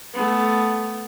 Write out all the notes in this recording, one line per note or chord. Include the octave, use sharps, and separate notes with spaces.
A3 B3